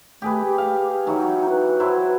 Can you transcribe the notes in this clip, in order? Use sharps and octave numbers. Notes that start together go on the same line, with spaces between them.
A3 G4 G#4 B4
G4
F5
E3 F#3 D#4 F#4
B4
F#3 E4 C5